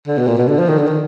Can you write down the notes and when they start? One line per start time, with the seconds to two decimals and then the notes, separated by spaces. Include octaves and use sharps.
0.07 D3
0.18 B2
0.27 A#2
0.38 B2
0.48 D3
0.59 F3
0.68 D#3
0.78 D3
0.87 D#3